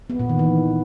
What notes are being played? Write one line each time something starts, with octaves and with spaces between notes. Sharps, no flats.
B3
A#2
D#3
E3